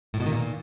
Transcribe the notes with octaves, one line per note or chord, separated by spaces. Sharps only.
A2
B2
D#3
A#2